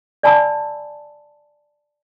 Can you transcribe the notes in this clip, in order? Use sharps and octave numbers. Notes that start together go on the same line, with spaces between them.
D5 G#5 A5 B5 E6